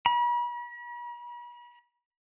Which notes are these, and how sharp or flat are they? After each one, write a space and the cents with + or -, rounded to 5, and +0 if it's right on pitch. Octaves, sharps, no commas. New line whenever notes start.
B5 -45